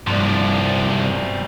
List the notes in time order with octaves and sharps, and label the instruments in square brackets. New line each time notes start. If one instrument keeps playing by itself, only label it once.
[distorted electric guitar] C2 F3 [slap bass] G2 A#3 [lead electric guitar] F#3 D5